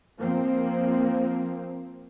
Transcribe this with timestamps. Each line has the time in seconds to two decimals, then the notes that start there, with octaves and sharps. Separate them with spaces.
0.18 F3 A#3 C4